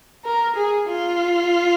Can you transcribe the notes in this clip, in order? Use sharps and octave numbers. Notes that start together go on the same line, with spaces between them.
A#4
G#4
F4